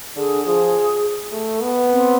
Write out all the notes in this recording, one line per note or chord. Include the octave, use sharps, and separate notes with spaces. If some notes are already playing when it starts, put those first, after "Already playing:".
D3 G#4
F3 G#4
A3
B3
C4